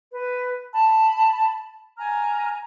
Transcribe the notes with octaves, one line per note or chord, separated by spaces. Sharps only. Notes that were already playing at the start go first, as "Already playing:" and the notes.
B4
A5 B5
G#5 A#5 F6